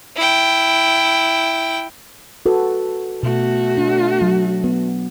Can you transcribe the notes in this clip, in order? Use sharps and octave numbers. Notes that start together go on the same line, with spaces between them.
E4 G5
F#4 A4 B4
B2 A3 F#4
D4
F#3
B3